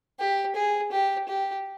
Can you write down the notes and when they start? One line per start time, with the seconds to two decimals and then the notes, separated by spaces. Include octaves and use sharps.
0.19 G4
0.55 G#4
0.92 G4
1.28 G4